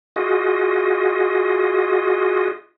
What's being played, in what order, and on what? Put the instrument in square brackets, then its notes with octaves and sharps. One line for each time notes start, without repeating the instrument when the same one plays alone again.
[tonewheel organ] F4 F#4 G#4 D#5